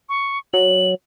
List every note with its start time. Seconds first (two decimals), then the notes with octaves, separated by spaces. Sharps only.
0.09 C#6
0.53 F#3 F#7